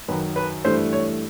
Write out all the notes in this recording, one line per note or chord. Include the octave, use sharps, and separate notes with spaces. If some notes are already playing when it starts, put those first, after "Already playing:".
F#2 D#3 F#3 B4
B4
G2 E3 A3 D4 C5
C#5